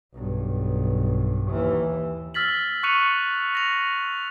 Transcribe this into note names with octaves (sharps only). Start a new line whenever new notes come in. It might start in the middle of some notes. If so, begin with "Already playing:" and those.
B1 G2
D#2 E3
E6 F6 A6 B6 F#7
C#6 F#6 C#7 D#7 F7
A#6 F7